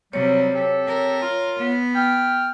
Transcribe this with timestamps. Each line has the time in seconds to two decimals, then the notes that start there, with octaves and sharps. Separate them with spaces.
0.13 C3 F#3 G3 C#5
0.53 C4 G4 A4
0.87 A#4
1.22 F4
1.59 B3
1.95 G5 F6